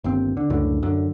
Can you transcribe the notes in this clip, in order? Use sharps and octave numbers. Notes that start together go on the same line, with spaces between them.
G1 D#2 C4
D3
C#2 F#2 A2 D3
F#2 D3